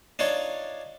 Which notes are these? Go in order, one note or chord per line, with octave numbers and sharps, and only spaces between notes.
D4 D#4 F4 C#5